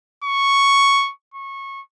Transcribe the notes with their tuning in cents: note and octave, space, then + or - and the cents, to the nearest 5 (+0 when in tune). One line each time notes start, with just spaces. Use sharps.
C#6 +0
C#6 -20